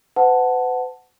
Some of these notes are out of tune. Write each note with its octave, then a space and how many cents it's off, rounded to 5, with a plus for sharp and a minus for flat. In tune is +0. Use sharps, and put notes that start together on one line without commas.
B4 +45 F#5 +0 A5 +0